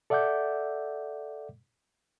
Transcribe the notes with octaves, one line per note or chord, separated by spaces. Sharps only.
A4 D5 E5 F#5 D6 G6